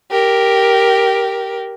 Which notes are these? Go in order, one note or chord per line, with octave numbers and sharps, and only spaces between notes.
G4 A#4